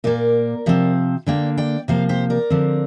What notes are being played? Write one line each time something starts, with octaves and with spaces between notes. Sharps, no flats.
A#2 A#3 A#4 D5
C3 F3 C4
D3 A#3 D5 G5
D5 G5
C3 F3 A#3 C5 F5
G4 C5
A#4 D5
D3 F3 C4